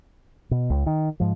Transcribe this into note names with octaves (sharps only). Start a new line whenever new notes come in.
B2
C#2
D#3
G#2 F3